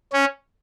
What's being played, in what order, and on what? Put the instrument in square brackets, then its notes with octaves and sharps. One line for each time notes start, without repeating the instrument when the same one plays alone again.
[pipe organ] C#4